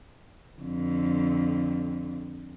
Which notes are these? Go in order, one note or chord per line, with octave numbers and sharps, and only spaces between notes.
F2 D3